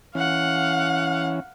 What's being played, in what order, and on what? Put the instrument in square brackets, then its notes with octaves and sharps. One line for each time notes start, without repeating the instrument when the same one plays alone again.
[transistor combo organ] E3 C#4 [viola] F5 F#5